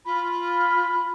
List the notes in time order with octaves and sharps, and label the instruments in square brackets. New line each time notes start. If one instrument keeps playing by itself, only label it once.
[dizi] F4 [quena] B5